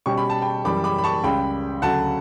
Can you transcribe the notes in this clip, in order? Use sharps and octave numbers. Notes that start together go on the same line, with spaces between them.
B2 G3 C#4 G4 C#6
B5
A5
G5 B5
F#2 E3 G3 B5 D6
B5 D6
B5
A5 C#6
C#2 C#3 G3 G5 B5
D2 C#3 F#3 F#5 A5